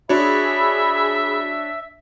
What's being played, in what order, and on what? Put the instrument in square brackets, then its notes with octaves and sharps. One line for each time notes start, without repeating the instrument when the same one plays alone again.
[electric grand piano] D4 C#5 [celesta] F#4 [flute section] G#4 B5 [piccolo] E5